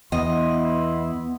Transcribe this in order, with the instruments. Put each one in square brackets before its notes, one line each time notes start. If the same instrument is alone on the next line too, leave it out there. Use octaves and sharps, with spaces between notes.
[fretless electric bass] E2 [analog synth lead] B3 [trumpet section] E4 C6 [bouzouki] D#5